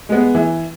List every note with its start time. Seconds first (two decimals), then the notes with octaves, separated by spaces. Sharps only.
0.09 G#3 B3
0.35 E3